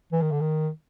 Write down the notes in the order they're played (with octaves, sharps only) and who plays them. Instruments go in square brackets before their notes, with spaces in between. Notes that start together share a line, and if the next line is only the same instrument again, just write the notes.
[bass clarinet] E3
D#3
D3
D#3